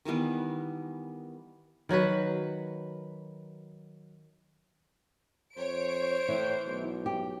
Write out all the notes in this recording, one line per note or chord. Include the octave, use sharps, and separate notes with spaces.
D#3 E3 G3 B3
D#3 F#3 F#4 B4
F2 C5 C#5 D7
A2 E3
B1
G4